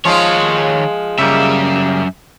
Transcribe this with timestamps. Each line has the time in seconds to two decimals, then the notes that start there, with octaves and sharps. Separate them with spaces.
0.05 D#3 F3 G#3 F4 C#5
1.18 F#2 C#3 G3 A#3 E5